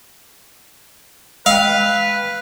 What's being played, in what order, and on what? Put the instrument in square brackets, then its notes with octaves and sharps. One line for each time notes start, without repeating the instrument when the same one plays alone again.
[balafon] G#3 G5 [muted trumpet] B4 [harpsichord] F5